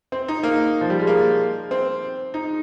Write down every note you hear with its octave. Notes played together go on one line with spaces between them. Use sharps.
C4
D#4
A#3
F3
G3
G#3
A#3
C4
D#4